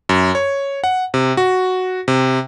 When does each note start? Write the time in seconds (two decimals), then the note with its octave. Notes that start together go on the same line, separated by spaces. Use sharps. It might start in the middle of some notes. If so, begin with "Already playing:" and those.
0.09 F#2
0.35 C#5
0.84 F#5
1.14 C3
1.37 F#4
2.08 C3